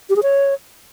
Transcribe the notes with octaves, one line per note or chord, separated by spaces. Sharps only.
G4
G#4
C#5